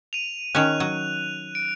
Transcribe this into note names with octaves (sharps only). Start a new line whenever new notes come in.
D#7 F7
D#3 C#4 F#6 F7
F#3
D7